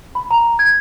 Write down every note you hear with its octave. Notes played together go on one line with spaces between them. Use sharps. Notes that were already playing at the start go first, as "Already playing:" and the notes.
B5
A#5
G#6